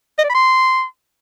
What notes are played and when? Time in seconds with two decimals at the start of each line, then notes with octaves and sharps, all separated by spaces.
0.19 D#5
0.24 D5
0.29 B5
0.35 C6